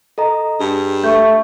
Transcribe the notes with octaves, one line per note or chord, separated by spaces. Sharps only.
A4 D#5 A#5
G2 G#4
A3 C#6 G6